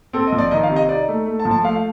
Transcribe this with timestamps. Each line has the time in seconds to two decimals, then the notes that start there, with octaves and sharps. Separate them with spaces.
0.13 C4 A4
0.27 D#5
0.32 F3
0.38 D5
0.51 D#3 D#5
0.63 F5
0.70 C3
0.76 D#5
0.89 D#4 D5
1.08 A3
1.26 A3
1.39 A5
1.45 F3
1.51 A5
1.63 A3 F5